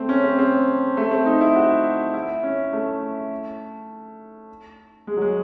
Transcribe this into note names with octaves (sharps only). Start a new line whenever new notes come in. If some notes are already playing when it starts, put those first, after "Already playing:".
Already playing: A3 C4
C#4
C4
C4
A3
C4
D#4
E4
F#4
E4
C#4
A3
G#3
F#3
G#3